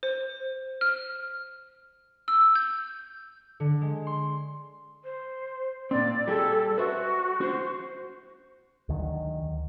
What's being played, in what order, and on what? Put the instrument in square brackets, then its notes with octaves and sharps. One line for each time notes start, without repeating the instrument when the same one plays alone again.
[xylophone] C5
F6
E6
G6
[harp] D3
G#3
C6
[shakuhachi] C5
[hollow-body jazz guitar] A#2 C4 [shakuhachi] D5
[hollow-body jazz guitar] G3 G#4 [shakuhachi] A4
[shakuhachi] F#4 [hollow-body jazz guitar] B4 C5 E5
[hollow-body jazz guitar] F#4 [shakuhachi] C5
[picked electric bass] D2 D#3 F3 F#3